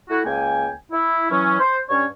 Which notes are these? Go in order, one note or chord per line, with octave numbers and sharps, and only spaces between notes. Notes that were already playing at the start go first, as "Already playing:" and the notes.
A3 E4 F#4
C#2 A#3 G5 G#5
E4
E3 F#3 C#4
C5
G2 C#4 C#5